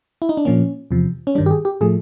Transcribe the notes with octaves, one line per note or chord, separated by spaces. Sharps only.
E4
D#4
D4
A#2 F3 A#3 C#4
E2 C3 F3
C#4
G2 D#3 G3 D4
G4
G#4
G4
A2 F3 A3 G#4